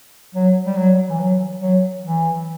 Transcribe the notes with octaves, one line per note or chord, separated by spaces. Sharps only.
F#3
G3
F#3
E3
F#3
F#3
E3